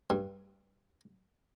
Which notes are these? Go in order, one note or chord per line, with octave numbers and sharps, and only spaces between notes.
G2